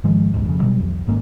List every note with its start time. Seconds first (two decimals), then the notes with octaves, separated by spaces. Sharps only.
0.04 G#2 D#3 F3 G#3
0.34 G1 C#2 G#2
0.45 F2 C#3
0.61 B2 F#3 G3
0.79 C2 F2
1.07 G#1 G#2 A#3 C#4